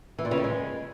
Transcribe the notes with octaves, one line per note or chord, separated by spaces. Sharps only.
E3
A#2
C#3
D#3
G#3